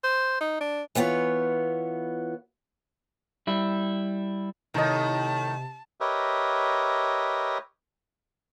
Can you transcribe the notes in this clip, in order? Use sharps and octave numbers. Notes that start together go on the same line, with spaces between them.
C5
D#4
D4
E3 B3 F4 C#5
G3 E4
A2 C3 D#3 A#4 D#5 A5
G4 A#4 B4 C#5 D#5 E5